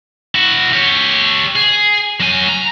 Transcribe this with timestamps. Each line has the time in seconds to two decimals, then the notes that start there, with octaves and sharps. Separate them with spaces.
0.35 E4 F#4
0.73 G4 C#5
1.56 G#4
2.20 F#3 G#5
2.49 A#5